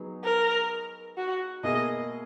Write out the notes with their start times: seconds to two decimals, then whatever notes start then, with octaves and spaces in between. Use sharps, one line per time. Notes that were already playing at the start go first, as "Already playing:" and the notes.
Already playing: F#3 B3 D#4 G#4
0.24 A#4
1.17 F#4
1.63 B2 A#3 E4 G#4 D#5